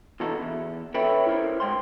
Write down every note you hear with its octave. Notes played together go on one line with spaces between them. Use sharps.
B2 E3 D#4 F#4 A4
E2
A4 B4 C#5 E5 G5 B5
E4 A#4 C5
G#2 G5 C6